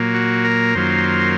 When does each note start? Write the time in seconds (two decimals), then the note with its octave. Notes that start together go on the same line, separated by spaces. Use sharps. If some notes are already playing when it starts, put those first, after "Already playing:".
Already playing: A#2 F#3 A#3
0.14 F#4
0.44 A#4
0.75 F#2 D#3 F#3 A#3 F4 C5